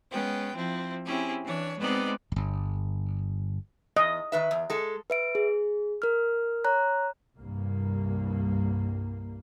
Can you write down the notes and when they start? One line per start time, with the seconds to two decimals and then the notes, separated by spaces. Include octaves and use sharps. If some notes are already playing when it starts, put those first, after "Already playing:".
0.11 G#3 B3 C#4 G5
0.54 F3 C4 E4
1.05 C4 C#4 E4 G4 G#4
1.44 E3 D4 C#5
1.77 G#3 B3 C4 D#4 D5
2.32 D1 G1
3.97 E2 D#5
4.32 D#3 B4 E5
4.51 E2
4.70 G#3 A4
5.10 B4 E5 D7
5.35 G#4
6.02 A#4 F6
6.64 C#5 A#5 F#6
7.37 C2 G2 A#3